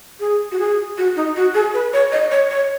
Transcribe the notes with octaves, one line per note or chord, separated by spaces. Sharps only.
G#4
F#4
G#4
F#4
D#4
F#4
G#4
B4
C#5
D#5
C#5
C#5